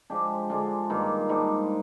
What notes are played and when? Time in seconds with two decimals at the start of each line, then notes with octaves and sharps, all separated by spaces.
0.10 F3 G#3 D4 G4
0.50 D3 G#3 D4 F4
0.90 G2 D#3 A#3 F4
1.29 G#2 G3 D4